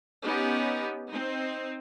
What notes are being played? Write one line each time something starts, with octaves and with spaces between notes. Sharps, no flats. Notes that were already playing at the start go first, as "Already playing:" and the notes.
B3 C#4 D#4 G4
C4 D#4